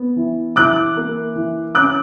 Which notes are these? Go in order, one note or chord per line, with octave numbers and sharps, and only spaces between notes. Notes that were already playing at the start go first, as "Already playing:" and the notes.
Already playing: B3
E3
E3 D6 F#6
A#3
E3
C#4 D6 F#6